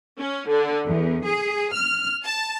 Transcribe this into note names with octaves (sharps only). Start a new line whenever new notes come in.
C#4
D3
E2
G#4
F6
A5